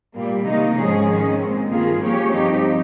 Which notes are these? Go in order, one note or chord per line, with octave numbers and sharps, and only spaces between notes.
A#2 G3 A#3
C3 D#3 A#3 D#4
G#2 F3 G#3 C#4 G#4
D#3 G#3 C#4
A#2 G#3 C4
G2 D#3 A#3 F4 G#4
F3 A#3 C#4 G4 C#5
G2 F3 C4 D#4 G4